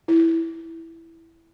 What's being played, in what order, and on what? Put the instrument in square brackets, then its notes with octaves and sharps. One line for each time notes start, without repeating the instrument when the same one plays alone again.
[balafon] E4